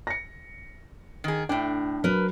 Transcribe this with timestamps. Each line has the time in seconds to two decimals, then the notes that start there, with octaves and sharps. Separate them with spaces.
0.07 A#6 C#7
1.24 D#3 G#4
1.49 A2 D4 G5
2.04 F#3 A#4 B4